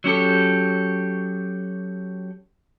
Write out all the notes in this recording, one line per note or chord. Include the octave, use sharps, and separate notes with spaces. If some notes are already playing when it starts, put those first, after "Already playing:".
F#3 C#4 G4 A4